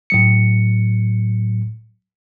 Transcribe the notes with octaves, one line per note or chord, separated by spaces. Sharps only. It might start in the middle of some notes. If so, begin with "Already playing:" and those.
A2 F#3 C#7